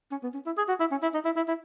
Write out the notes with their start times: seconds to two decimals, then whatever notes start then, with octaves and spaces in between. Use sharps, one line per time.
0.11 C#4
0.23 B3
0.34 C#4
0.46 E4
0.57 G#4
0.68 F#4
0.80 E4
0.91 C#4
1.02 E4
1.14 D#4
1.25 E4
1.36 E4
1.48 E4